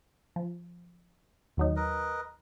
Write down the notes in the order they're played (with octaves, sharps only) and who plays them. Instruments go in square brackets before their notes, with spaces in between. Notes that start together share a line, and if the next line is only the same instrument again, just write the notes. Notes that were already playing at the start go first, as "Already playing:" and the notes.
[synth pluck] F3
D#2 F#3 D#4
[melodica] A#4 B4 D#5